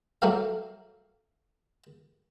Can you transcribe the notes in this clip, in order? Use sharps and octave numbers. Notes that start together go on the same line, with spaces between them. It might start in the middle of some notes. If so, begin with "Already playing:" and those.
F#3 A3 A#3 F#4 A#4 F5